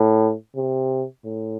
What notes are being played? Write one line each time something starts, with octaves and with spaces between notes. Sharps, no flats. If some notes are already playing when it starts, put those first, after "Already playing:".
Already playing: A2
C3
A2